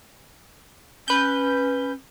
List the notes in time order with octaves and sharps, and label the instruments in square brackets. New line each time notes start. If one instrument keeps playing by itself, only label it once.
[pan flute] C#4 [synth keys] B4 G6